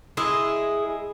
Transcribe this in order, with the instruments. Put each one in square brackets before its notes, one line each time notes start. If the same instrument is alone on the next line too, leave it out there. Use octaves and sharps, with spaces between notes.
[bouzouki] G#3 E4 G#4